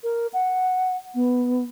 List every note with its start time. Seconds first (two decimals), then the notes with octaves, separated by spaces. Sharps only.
0.04 A#4
0.33 F#5
1.15 B3